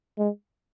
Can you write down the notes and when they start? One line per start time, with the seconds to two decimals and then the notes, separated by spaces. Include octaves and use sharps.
0.19 G#3